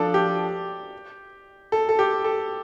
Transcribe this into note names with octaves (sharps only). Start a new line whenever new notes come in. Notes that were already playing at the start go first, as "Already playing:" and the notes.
Already playing: F3 D4 A4 D5
G4
A4
A4
G4
A4